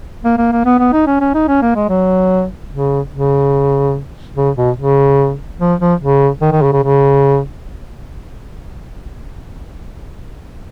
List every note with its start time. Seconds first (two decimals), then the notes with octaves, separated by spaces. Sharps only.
0.25 A#3
0.38 A#3
0.52 A#3
0.65 B3
0.79 B3
0.93 D#4
1.07 C#4
1.20 C#4
1.34 D#4
1.48 C#4
1.62 A#3
1.75 G#3
1.89 F#3
2.71 C#3
3.12 C#3
4.36 C#3
4.56 B2
4.77 C#3
5.60 F3
5.80 F3
6.00 C#3
6.42 D#3
6.52 D#3
6.62 C#3
6.73 C#3
6.83 C#3